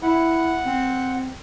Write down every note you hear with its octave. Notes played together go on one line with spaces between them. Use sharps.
E4 F#5
C4